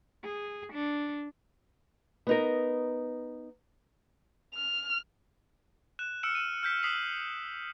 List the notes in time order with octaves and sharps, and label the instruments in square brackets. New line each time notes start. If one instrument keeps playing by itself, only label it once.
[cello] G#4
D4
[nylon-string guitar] B3 D#4 A#4
[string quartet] F6
[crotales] F#6 E7
E6 F6 C#7 D7 E7
D#7 E7
F6 G6 B6
D#6 B6 C7 E7 F#7